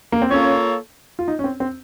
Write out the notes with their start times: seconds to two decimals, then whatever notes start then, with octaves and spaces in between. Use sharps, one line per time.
0.12 A#3
0.22 C4
0.30 A#3 C#4 F4 A4 C#5
1.19 F4
1.28 D#4
1.39 C#4
1.44 C4
1.60 C4